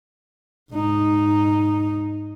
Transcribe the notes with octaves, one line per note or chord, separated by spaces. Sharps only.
G#2 D#4